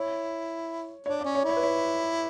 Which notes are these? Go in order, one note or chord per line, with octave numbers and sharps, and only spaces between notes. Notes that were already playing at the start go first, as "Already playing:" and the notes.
Already playing: E4 C#5
D4 C#5
D5
C#4
C#5
E4
C#5
B4
C#5